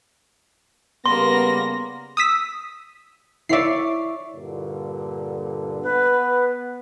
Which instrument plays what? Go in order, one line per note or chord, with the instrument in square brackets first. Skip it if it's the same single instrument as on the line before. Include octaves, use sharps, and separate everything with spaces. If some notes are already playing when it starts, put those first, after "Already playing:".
[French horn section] C#3 G3 B3 [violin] A#3 A#6 [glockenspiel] C6
[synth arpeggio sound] D#6 E6 B6
[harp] E4 C#5 D5 [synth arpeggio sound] E5 C7
[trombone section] G2 A#2 D3
[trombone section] B3 [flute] B4